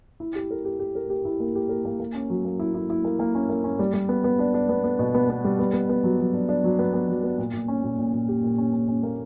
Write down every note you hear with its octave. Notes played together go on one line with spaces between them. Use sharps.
E4
G4
A#4
G4
G4
A#4
G4
E4
A#3
G4
A#4
A#3
A#3
C#4
F#3
A#3
E4
E4
E4
A#3
A#3
C#4
A#3
C#4
G3
G3
B3
B3
D4
D4
B3
B3
B2
B3
B3
G3
B3
B3
B3
F#3
F#3
D4
D4
F#3
B3
B3
F#3
B3
A#2
A#2
C#4
A#2
A#2
A#2
G4
A#2
C#4
C#4
C#4
A#3